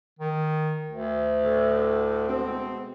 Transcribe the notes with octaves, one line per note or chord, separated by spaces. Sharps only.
D#3
D2
A2 D3
B2 G#3 C4